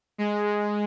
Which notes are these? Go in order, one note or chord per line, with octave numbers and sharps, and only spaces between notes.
G#3